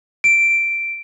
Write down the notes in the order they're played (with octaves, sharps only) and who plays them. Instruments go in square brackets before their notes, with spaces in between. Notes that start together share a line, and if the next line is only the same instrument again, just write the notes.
[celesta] D7